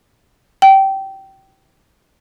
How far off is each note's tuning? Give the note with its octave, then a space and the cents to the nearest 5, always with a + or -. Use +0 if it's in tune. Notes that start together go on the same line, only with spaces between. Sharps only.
G5 -20